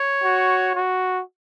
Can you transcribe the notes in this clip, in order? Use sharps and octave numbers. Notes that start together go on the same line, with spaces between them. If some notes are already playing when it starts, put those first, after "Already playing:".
Already playing: C#5
F#4
F#4